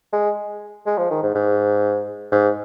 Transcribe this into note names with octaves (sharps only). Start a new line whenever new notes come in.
G#3
G#3
F3
D#3
G#2
G#2
G#2